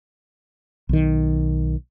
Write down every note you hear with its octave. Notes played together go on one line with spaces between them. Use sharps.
B1 D#3